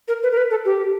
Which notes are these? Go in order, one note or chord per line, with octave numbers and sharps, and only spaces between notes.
A#4
B4
A#4
B4
A4
G4